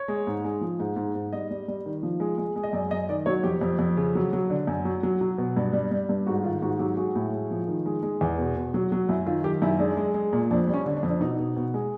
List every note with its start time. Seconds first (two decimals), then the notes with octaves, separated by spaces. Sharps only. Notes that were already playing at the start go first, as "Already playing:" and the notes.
Already playing: C#5
0.08 G#3
0.27 G#2
0.44 G#3
0.61 F3
0.80 G#2
0.96 G#2
1.15 G#2
1.33 G3 D#5
1.51 G3
1.68 G3
1.86 D#3
2.03 F3
2.20 G#3
2.38 G#3
2.56 G#3
2.63 D#5
2.73 F#2 D5
2.91 F#2 D#5
3.09 D#3 D5
3.26 F#3 C#5
3.44 F2 G4
3.61 F2
3.79 F2
3.97 C#3
4.15 F#3
4.33 F#3
4.50 D3
4.67 F#2
4.85 F#3
5.03 F#3
5.21 F#3
5.38 B2
5.57 G2
5.73 G3
5.91 G3
6.09 G2
6.26 G#2 F#4
6.44 D#3 F4
6.62 G#2 F#4
6.79 F#3 G4
6.97 G#3 F#4
7.15 A2
7.33 G#3
7.51 F3
7.68 D#3
7.86 G#3
8.03 G#3
8.21 E2
8.38 B2
8.56 B2
8.74 F#3
8.92 F#3
9.09 F#2 E4
9.26 D#3 F4
9.44 D#3 G4
9.62 F#2 E4
9.79 G#3 D4
9.97 G#3
10.14 G#3
10.33 A#2
10.51 F2 D4
10.68 G3
10.74 C#4
10.86 D3
10.97 D4
11.03 F2
11.09 D4
11.21 B2 D#4
11.39 B2
11.56 B2
11.74 G#3